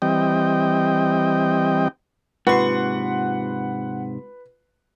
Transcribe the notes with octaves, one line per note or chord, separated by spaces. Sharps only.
E3 G3 C4 D#5 G5
G#2 C3 F4 B4 F#5 C6 C7